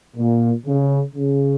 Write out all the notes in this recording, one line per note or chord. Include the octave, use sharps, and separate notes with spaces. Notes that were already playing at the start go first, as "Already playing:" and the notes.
A#2
C#3
C#3